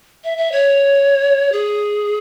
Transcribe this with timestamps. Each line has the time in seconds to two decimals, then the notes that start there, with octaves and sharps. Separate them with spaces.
0.24 E5
0.38 E5
0.52 C#5
1.52 G#4